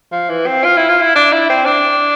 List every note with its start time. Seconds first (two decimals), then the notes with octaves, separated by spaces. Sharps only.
0.12 F3
0.29 E3
0.46 C4
0.64 F4
0.77 E4
0.89 F4
1.01 E4
1.15 D4
1.32 E4
1.50 C4
1.66 D4